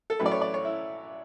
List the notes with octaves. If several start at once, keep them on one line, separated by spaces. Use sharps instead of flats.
A4
A1 A2 F#3 A3 B4
D5
C#5
D5
C#5
E4